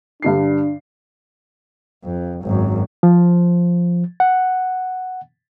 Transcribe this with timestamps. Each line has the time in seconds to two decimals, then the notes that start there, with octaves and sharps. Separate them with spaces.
0.22 G2 D3 D4 C7
2.04 F2
2.44 G#1 F#2
3.03 F3
4.20 F#5